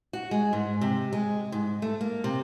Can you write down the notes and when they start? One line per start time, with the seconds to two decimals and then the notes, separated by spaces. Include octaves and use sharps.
0.13 F#4
0.31 G#3
0.53 G#2
0.81 C3
1.13 G#3
1.52 G#2
1.82 A3
2.01 A#3
2.24 C3